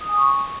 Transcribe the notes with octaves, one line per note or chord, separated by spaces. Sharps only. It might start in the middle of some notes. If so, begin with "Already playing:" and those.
D#6
G#5
C#6